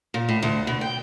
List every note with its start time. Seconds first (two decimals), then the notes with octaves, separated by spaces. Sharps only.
0.14 A#2
0.29 A2
0.43 D2
0.67 B2
0.81 G5